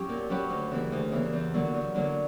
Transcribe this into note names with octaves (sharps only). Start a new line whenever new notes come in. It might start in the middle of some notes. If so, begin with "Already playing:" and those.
Already playing: F#3 C#4 E4 G4
A#2
F#3 C#4 G4 B4
D2
C#3 E3 A#3 E4
D2
C#3 E3 A#3 E4
E2
D3 F#3 A#3
E2
D3 F#3 A#3